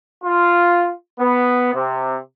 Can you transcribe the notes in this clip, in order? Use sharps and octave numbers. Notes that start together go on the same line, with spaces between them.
F4
B3
C3